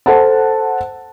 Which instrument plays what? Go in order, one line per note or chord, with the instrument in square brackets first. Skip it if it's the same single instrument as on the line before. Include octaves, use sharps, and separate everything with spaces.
[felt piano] A4 C5 F#5 A5